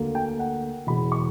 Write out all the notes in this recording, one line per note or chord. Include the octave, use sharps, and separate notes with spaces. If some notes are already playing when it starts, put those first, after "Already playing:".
Already playing: D2 D3 A#3
G5
F#5
E1 E2 C#3 B5
C#6